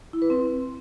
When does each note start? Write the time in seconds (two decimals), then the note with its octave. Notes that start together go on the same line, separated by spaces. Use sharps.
0.13 E4
0.22 B4
0.30 C4